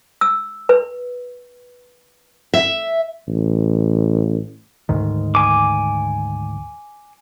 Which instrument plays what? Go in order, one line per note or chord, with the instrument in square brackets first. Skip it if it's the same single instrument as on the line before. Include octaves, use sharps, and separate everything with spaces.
[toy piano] E6
B4
[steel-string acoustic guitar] E5
[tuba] A1
[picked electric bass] D2 G#2 D#3
[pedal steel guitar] G#5 D6